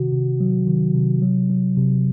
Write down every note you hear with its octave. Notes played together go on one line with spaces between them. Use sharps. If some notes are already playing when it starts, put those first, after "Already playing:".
Already playing: C3 D#3 F#4
C3
F#3
D#3
C3
F#3
F#3
C3